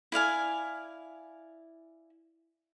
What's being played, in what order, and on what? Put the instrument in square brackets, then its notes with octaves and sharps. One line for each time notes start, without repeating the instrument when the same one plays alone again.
[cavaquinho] E4 D5 F5 G#5